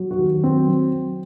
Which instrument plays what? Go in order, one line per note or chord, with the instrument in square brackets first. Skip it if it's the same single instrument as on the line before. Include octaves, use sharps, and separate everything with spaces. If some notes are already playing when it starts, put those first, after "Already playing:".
Already playing: [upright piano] F#3
F#4
D#2
F#3 C4
F#3